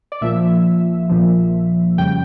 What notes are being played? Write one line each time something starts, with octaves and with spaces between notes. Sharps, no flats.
D5
A#1 A#2 F3 E5
A#1 A#2 F3
F2 C#3 G3 G5